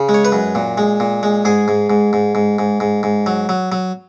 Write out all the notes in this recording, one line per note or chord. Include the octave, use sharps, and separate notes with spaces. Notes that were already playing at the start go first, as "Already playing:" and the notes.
Already playing: C#3
G#3
C#5
B4
F#2
A#2
G#3
A#2
G#3
G#2 G#4
G#2
G#2
G#2
G#2
G#2
G#2
G#2
F#3
F#3
F#3